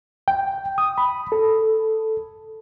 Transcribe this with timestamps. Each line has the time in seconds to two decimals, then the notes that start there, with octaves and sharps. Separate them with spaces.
0.28 G5
0.78 D#6
0.98 B5
1.32 A4